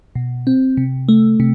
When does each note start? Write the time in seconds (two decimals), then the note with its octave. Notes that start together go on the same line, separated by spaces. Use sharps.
0.15 B2
0.47 C4
0.77 C3
1.09 A3
1.40 C3